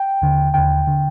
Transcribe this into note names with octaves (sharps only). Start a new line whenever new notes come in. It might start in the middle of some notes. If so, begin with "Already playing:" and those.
Already playing: G5
D#2 D3
D#2 D3 G5
D3